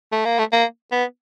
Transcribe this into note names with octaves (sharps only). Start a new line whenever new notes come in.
A3
A#3
A3
A#3
B3